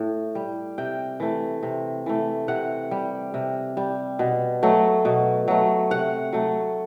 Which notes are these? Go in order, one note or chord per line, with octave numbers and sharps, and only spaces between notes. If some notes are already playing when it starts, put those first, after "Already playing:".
Already playing: A2
G3
C3 G5
E3 A3
C3
E3 A3
C3 F#5
G3
C3
G3
B2
F#3 A3
B2
F#3 A3
C3 F#5
F#3 A3